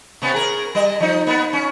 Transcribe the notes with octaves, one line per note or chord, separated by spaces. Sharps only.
C3 B3 C#4
G#4 A#4
G3 D#5
F3 D#4
A#3 B3
C#4